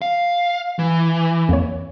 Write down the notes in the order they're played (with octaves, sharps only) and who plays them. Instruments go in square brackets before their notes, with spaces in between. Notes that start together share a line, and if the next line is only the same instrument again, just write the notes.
[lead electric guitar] F5
E3
[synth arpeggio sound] F2 A#3 C#5